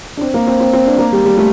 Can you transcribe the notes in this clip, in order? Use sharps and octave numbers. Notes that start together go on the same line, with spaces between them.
D4
C4
A#3
C4
C4
C4
D4
A#3
G3
G3
A3